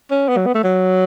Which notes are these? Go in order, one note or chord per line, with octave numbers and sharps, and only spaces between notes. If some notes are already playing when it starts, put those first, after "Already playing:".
C#4
B3
F#3
B3
A3
F#3